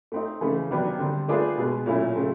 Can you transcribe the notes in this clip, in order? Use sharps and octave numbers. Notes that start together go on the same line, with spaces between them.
A3 C4 D#4
C#3 E3 A3
C3 D#3 F#3 B3 D4
D3 G3 C4
A3 D4 F4 G#4 B4
B2 G#3 B3
A#2 F#3 A3 C#4 E4
C#3 F#3 A3 C4